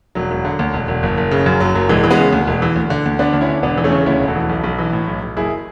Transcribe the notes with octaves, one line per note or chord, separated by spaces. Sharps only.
E1 F#3
E1
D3
D2
E1
E1
F#1
F#1
C#3
F#2 F#3
F#1 F#3
F#1 F#3
E1 E3 G#3
E3
G#3 B3
C#3
D2
E1
E3
D2
D3
D2
D3 B3 D4
D2
C#4 E4
D3
E1 B3 D4
E3
A3 C#4
C#3
D2 C#4 E4
E1
F#4 A4
E3
B1
B1
E3
A2
B1
B1
F#1 E4 G#4